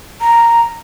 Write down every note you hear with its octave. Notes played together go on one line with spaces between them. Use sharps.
A#5